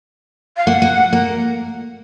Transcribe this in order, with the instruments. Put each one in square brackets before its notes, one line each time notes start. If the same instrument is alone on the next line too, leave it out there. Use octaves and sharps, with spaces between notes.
[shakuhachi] F5
[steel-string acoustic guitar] A#3 [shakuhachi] F#5
[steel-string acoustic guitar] A#3
A#3